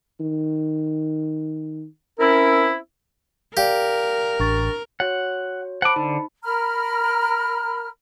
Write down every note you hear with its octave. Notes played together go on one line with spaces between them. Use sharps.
D#3
C4 C#4 E4 A#4
G4 A#4 D5 F5
A1 D4 C#6 A6
F#4 C#5 F#5
C5 F#5 A5 B5 D6
D3 D#4
A#4 A#5 B5 F6